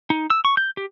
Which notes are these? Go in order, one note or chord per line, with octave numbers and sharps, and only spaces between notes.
D#4
E6
C#6
G6
G4